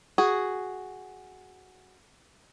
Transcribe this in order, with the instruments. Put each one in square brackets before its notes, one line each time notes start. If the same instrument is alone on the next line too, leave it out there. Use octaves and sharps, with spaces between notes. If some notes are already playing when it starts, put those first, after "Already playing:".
[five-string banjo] F#4 G#4